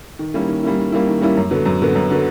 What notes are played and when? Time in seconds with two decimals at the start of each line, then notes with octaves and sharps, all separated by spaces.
0.19 D#3
0.34 G3 A#3 C#4 E4
0.49 D#3
0.63 G3 A#3 C#4 E4
0.78 D#3
0.92 G3 A#3 C#4 E4
1.08 D#3
1.22 G3 A#3 C#4 E4
1.37 F#2
1.51 D3 F#3 B3
1.66 F#2
1.81 D3 F#3 B3
1.95 F#2
2.10 D3 F#3 B3